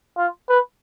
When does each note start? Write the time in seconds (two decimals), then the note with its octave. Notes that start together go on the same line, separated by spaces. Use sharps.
0.17 F4
0.49 B4